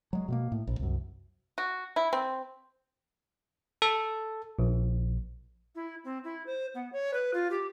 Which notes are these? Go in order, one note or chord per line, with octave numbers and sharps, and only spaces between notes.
F#3 G#3
B2 G#3 A#3
A2
A#1
C2 F#2
F#4
E4
C4
A4
A#1
E4
C4
E4
C5
B3
C#5
B4
F4
G4